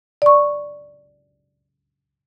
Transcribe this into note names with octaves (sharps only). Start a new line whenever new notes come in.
D5 C#6